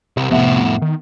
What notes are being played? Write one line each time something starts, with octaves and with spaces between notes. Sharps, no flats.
C2 C3
F2 A2 B3 E5 F#5
D#3